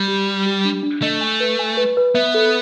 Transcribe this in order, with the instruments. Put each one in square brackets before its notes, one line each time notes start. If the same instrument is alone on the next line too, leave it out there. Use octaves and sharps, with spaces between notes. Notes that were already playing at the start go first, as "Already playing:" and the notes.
Already playing: [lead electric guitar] G3
[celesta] G4
G4
G4
D4
D4
[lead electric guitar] A3 [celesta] D#5
[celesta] G#5
B4
G#5
B4
B4
[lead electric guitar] B3 [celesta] E5
[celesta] A4